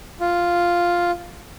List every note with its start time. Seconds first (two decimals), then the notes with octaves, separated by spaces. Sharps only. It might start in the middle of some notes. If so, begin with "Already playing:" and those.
0.20 F4